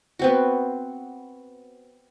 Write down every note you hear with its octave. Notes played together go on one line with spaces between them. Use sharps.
B3 C4 F#4